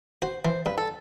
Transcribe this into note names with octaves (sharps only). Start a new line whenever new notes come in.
F#4 C5
E3 C5
G2 B4
A4